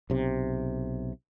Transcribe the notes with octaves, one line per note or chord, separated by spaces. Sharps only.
B1 C3